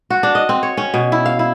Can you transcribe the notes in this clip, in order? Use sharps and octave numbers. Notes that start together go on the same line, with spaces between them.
F#4
D4
D#5
C4
C#5
C#4
B2
E4
F5
E4